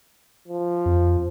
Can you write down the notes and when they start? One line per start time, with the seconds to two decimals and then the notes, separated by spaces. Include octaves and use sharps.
0.48 F3
0.86 F2